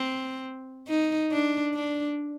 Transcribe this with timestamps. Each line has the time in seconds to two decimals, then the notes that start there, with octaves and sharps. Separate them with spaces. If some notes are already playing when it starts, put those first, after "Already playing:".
Already playing: C4
0.88 D#4
1.32 D4
1.74 D4